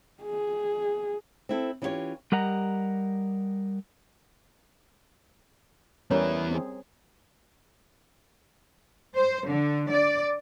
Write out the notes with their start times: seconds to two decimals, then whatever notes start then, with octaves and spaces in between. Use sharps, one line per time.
0.23 G#4
1.49 C4 E4 A4
1.82 E3 C#4 E4 F4 G4 C#5
2.32 G3 G4 A#4 D#5 F#5 A#5
6.11 E3 G3 B3 C#4 A#4 C#5 A#5 B5
6.51 C4 G#4
9.14 C5
9.47 D3
9.90 D5